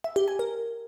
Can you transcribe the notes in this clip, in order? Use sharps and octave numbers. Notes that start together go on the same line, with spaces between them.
E5
G4
G#5
A#4